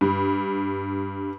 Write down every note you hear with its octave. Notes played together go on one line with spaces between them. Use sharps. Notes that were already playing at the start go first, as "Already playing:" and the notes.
G2